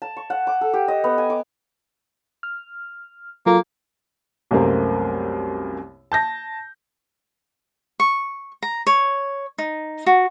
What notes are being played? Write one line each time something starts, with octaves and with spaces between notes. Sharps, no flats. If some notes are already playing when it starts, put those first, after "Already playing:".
A5
C#6
F#5
D6
A4
G4
D#5
B3
G#5
D6
F6
F#3 A#3 F4 A4
C2 F#2 A3 A#3 C4
A5 G6 A#6
C#6
A#5
C#5
D#4
F#4